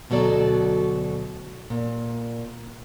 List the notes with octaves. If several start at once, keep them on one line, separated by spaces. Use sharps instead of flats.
D2 B2 F#3 A4 D5
A#2